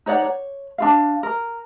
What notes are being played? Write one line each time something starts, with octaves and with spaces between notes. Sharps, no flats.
D#4 C#5 D5 F#5
C#5
D4 F4 F5
A#4